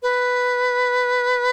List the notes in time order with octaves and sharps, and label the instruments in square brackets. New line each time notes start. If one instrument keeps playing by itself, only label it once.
[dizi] B4